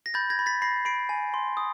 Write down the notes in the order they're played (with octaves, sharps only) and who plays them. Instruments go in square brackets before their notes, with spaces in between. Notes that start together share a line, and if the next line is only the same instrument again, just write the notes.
[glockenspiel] A#6
B5 G6 A6
G#6 A#6
B5
A6 B6
B5 A#6 C7
B5 C7 D7
G#5
C6
D#6